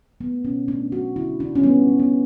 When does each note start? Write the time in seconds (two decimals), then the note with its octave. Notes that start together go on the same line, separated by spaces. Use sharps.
0.20 A3 B3
0.44 B2 C#4
0.68 A3 D4
0.92 A3 F#4
1.16 D3 E4
1.40 D3 D4
1.55 C#4
1.63 G3 B3
1.88 G3
1.99 B3